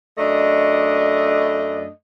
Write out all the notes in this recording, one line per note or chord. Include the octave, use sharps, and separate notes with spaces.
F#2 A3 D4 D#5